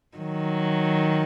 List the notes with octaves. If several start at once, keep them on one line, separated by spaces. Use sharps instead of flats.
D#3 F#3